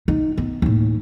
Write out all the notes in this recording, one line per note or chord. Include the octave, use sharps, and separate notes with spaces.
D#4
B3
D#2 A2